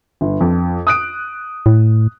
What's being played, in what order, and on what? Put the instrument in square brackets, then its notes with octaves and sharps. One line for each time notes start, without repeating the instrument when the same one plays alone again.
[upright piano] G1
F2
D#6 F#6 D7
[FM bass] A2